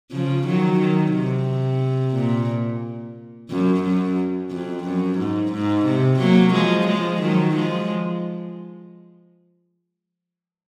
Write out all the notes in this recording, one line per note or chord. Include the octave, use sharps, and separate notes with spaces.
C#3 F3
D#3 F#3
D#3
C3
A#2
F#2
F#2
F2
F#2
G#2
G#2
C3
F#3 A#3
F3 G#3
F3 G#3
D#3 F#3
F3 G#3